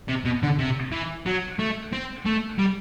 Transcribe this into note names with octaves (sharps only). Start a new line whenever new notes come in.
C3
B2
D3
C3
E3
F#3
A3
C4
A3
G3